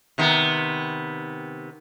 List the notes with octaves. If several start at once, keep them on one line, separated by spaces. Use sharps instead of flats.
C3 D#3 B3